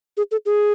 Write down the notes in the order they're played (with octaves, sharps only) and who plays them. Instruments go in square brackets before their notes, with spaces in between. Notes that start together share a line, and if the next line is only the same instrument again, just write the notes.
[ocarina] G#4
A4
G#4